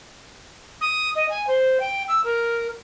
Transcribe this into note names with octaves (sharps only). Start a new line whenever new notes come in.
D#6
D#5
G#5
C5
G5
E6
A#4